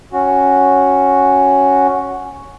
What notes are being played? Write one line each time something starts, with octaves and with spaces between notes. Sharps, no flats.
C#4 F#4